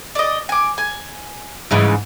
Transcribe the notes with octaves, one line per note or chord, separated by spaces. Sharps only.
D5 D#5
G#5 D6
G#5
G#2 C#3 E3